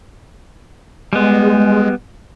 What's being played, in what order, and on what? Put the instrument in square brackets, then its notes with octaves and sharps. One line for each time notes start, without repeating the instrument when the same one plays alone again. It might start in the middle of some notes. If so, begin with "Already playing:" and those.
[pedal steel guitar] G3 B3 [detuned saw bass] G#3